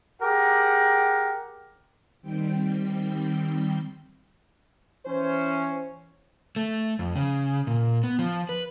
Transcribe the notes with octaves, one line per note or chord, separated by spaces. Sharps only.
G4 G#4 A#4 F#5
D#3 G3 C4 G5
E3 C#4 C5
A3
F2
C#3
A#2
B3
F3
B4